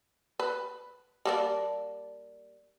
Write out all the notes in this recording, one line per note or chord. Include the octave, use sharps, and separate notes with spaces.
B4
G3 A#3 D4